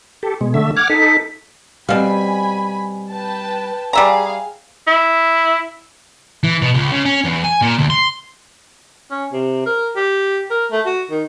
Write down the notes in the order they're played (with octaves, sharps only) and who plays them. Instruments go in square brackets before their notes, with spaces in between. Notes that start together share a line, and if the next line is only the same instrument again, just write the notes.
[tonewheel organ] G4 A4
B2 G#3
D3 A3 E5
[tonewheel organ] F#5 D6 F6 [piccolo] G#6
[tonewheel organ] D#4 A4 [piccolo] B6
[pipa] B2 F5 [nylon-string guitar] G3 C4 [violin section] G#5 B5
[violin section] B4 G5 A5
[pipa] G3 E5 A#5 [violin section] G#4 F5
[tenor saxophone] E4
[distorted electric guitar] E3
B2
C#2
C#3
C#4
E2
G#5
A#2
D2
C6
[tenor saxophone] C#4
C3
A#4
G4
A#4
A3
F#4
D#3